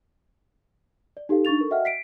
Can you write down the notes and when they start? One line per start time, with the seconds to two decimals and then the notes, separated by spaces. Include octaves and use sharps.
1.17 D5
1.29 D#4 G4 A4 F5
1.45 D4 D#4 C#6 A6 F7
1.59 A4 A#4 C#6
1.70 F#4 D#5 E5 F#5 G5 F6
1.85 B6 C7 D7